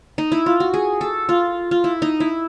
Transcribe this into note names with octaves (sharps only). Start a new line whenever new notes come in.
D#4
E4
F4
F#4
G#4
A4
F4
F4
E4
D#4
E4